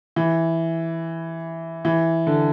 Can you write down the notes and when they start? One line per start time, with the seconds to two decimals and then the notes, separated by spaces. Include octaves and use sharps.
0.16 E3
1.85 E3
2.27 D3